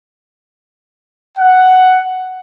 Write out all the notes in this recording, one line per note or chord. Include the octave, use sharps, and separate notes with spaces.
F#5